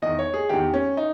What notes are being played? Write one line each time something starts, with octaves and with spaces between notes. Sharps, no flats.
E2 D#3 D#5
C#5
G#4
E2 D#3 G4
C#4
D#4